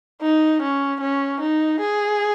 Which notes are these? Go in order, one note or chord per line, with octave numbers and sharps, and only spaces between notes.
D#4
C#4
C#4
D#4
G#4